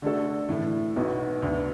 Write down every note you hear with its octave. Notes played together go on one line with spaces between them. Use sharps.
D3 A3 D4 F#4 A4
A2 E3 A3
B1 B2 B3 F#4
D2 D3 B3